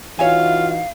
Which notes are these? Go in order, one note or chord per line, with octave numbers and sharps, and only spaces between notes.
E3 D#4 F4 F#4 C#5 E5 F5 G#5